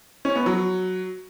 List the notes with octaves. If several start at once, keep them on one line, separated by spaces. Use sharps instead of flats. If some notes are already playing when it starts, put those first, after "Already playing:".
C#4
B3
F#3